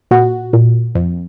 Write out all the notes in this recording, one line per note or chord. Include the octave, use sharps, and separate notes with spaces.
A#2 F#4
A#2
F2